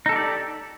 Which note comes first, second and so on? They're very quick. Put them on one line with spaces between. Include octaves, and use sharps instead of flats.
D#4 A4 G4 D5